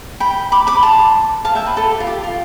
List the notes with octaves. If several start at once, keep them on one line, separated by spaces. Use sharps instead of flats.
G5 B5
B5 D6
B5 D6
A5 C6
F5 A5
E5 G5
B4
A4
G4
F4
G4
F4